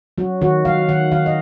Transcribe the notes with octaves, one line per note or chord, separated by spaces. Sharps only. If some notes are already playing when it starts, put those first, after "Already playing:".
F#3 F#4
D#3 F#4
F#3 F5
D#3 F#5
D#3 F5
D#5